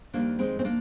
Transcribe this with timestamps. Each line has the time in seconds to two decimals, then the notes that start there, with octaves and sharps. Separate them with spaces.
0.14 F2 D#3 G3 A#3 D4
0.39 G#3 C4
0.59 C4
0.65 A#3 D4